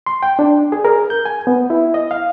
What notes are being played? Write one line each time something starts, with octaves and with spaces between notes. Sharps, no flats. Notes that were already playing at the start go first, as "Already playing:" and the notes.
C6
G5
D4
G#4
A#4
G6
G#5
B3
E4
D#5
F5